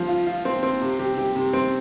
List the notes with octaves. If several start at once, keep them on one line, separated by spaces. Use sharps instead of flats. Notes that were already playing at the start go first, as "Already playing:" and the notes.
Already playing: F3
F4
F4
C4
C4
C3
G4
G4
C3
C4